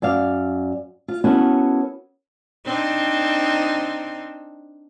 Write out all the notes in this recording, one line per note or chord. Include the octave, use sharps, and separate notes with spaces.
F#2 D5 F5
F4
B3 C#4 E4 F#4 A4 A#4
C4 D4 D#4